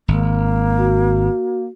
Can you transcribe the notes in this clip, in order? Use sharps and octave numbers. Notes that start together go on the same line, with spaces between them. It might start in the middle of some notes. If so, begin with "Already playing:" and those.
G#1 A#3
F#4